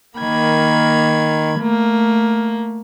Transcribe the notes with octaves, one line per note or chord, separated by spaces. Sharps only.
D#3 A#3 B5 G#6
A3 A#3